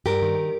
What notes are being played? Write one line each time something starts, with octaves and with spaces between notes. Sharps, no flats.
G2 G4 A#4
D#3